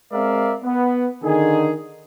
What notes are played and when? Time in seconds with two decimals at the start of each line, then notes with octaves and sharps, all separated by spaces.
0.13 G#3 C4 A#4 D5 E5 F5
0.63 B3
1.23 D3 D#3 D#4 G#4